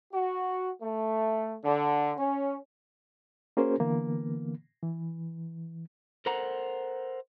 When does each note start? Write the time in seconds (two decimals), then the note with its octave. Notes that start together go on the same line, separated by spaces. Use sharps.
0.14 F#4
0.82 A3
1.64 D3
2.17 C#4
3.57 A#3 C#4 F#4 G#4 A#4 C5
3.79 D3 E3 A#3 B3
4.83 E3
6.26 A4 A#4 C5 F#5 A#5